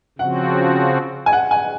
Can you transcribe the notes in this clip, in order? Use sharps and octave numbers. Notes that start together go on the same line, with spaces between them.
C#3 F3 C4 F#4 F#5
G#5
F#5
G#5